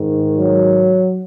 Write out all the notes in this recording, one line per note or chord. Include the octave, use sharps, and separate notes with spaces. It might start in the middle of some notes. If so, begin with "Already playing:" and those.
Already playing: G#2 D#3
F#3